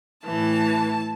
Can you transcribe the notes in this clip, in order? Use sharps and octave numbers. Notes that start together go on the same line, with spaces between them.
A2 E3 A5